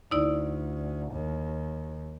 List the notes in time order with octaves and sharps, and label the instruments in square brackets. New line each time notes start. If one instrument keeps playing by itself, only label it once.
[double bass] D2 [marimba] D#4 E4 D5
[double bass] D#2